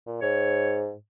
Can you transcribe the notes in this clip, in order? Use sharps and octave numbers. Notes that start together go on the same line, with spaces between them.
A#2
G#2 C#5